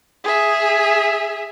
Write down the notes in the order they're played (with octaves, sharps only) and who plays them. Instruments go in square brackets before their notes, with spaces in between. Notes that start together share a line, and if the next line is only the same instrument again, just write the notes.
[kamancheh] G#4 E5